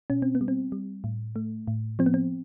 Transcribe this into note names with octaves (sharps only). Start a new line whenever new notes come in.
B2 C#4
C4
B3
G3
C4
G3
A2
A3
A2
F3 C4
B3
C4